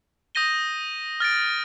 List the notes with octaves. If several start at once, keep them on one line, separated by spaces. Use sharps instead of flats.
D#6 G6 A#6 D#7 G7
F6 A6 D7